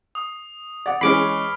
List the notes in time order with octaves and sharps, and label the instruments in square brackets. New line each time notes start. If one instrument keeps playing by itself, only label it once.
[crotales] D#6
[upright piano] D5 F#5
[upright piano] E3 G#3 C#4 [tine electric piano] B5 D6 [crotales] F6 B6 C7